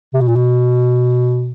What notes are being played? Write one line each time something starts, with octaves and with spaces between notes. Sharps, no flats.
C3
B2
A#2
B2